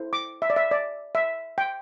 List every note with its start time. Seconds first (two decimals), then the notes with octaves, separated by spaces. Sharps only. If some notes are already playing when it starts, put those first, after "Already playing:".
Already playing: E4 A4 C5
0.13 D6
0.42 E5
0.50 D5
0.56 E5
0.71 D5
1.15 E5
1.58 G5